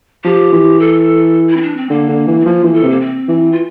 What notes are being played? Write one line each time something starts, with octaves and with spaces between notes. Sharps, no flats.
F3 G4
E3
A4
E4
C4
D4
C4
D3 A#3
D3
E3
C4
F3 A#3
E3
A4
C3
A#3
C4
E3
F4